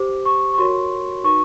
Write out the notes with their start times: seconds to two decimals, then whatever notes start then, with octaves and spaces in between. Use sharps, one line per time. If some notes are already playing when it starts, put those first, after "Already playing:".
Already playing: G4 C5 D6
0.26 C#6
0.54 C#6
0.58 F#4 A#4 C#5 C6
1.24 D#4 F#4 B4 C#6